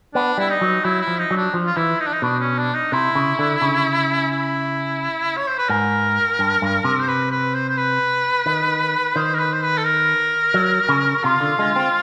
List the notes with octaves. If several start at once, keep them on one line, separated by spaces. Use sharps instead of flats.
B3 D4
G3 E4
D#4
F#3
F#3 E4
E4
F3
D#4
F#3
D4
F3
F4
E3 E4
D#4
D4
D#4
B2 D4
C#4
D4
D#4
C3 E4
C#3
D3
C#3
E4
C#5
C5
B4
G#2 A#4
G2
G2
C3
C5
B4
B4
C5
C5
B4
D#3
D#3 C5
A#4
B4
C5
B4
A4
A#4
F#3
C#3
C3 F4
D3
G#3
C4